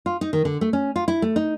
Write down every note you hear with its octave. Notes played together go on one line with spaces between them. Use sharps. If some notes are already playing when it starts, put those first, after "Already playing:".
F4
D#4
D#3
D3
A3
C#4
F4
E4
A3
D#4